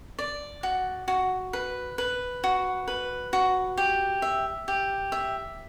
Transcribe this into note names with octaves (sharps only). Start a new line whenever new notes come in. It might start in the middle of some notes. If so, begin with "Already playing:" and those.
D5
F#4
F#4
B4
B4
F#4
B4
F#4
G4
E5
G4
E5